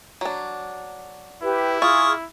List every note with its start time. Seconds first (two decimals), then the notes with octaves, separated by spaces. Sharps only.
0.21 F#3 D4
1.42 E4 G4 B4
1.82 F4 G#4 C#6 D#6 F6